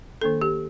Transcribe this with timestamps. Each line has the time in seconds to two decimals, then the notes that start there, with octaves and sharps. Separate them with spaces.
0.21 D#3 A#3 D4 A4
0.42 G4